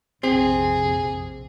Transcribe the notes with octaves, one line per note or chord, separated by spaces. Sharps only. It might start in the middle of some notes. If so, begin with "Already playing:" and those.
A#1 F2 C3 C4 G#4